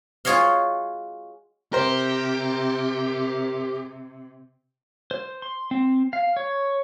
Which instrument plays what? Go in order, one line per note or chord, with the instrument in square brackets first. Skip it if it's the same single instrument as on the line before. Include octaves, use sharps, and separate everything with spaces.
[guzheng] F4 F#4 G#4 C#5 D#5 F5
[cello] C3 [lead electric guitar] G4 [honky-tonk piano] A#4 C5
[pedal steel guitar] C5
C6
C4
F5
C#5